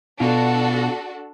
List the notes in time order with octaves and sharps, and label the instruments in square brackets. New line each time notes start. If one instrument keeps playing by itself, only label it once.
[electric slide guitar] B2 F4 [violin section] D4 F#4 A4